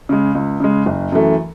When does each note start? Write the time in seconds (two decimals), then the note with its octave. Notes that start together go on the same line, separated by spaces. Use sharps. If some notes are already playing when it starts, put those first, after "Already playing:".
0.09 C#3 G#3
0.35 C#2
0.60 C#3 G#3
0.86 F#1
1.12 F#2 E3 A3